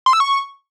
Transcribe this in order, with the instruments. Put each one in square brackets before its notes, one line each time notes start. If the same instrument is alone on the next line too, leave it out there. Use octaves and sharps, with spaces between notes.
[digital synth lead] C6
E6
C#6